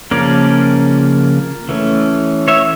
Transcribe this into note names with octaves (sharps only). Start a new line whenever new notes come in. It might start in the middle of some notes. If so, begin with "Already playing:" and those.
C#3 F3 A#3 C#4 A#4 D5
E3 A3 C#4
C#5 E5